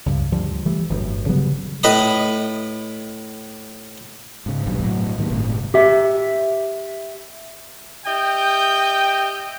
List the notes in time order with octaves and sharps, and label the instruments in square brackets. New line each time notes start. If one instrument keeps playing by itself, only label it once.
[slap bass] C#2 G2
D2 F3 G3
E3 G3 A3
G1 F#2 A2
C#3 F#3 G3 B3
[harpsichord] A2 B4 D#5 B5 D#6
[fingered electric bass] G#2 C#3
D#1 B1 G2
A2 F#3
G#2 D#3 A#3
G1 A2 C3 G#3
[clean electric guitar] G4 E5
[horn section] G4 D#5 E5 G5